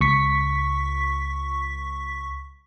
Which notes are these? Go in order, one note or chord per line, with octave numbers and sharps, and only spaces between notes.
C#2 C#6 B6